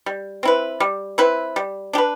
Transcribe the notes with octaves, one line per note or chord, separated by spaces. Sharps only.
G3
C4 E4 B4
G3
C4 E4 B4
G3
D4 G4 B4